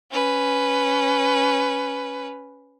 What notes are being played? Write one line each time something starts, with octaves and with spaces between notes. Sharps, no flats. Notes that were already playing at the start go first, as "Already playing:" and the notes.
C#4 B4